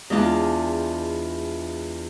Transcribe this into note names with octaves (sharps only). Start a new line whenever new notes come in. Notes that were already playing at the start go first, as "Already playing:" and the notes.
E2 G#3 D4 F4 A5